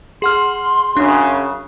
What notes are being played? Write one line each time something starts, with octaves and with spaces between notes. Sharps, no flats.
G#4 F#5 C6 F6
F#2 C#3 D4